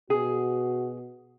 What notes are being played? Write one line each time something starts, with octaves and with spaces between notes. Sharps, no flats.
B2 F#4 G#4